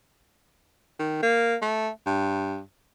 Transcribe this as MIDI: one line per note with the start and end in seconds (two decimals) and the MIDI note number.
0.99 1.18 51
1.23 1.56 58
1.62 1.89 57
2.06 2.61 43